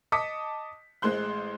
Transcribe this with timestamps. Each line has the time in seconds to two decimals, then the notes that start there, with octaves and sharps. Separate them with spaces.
0.12 D#5 A5 D6 D#6 B6 C#7
1.02 A1 G#3 C5 C6 F#6